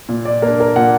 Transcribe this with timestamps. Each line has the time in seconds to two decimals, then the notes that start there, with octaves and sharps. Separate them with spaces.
0.09 A#2
0.25 D5
0.42 A#3 D4 A#4
0.60 A#4
0.76 A#2 F#5